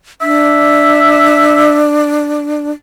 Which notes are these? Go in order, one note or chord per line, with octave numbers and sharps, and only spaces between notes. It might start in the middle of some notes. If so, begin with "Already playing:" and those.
D4 E5